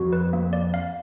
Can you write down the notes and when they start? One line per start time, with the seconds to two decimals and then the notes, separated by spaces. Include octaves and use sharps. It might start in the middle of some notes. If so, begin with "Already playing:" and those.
Already playing: F2 F#4
0.13 B4
0.33 A#3
0.53 D5
0.74 F5